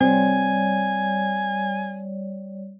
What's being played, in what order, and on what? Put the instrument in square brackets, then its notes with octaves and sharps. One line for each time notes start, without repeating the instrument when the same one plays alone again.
[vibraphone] G3 C#5 D5 [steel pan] C4 [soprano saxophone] G#5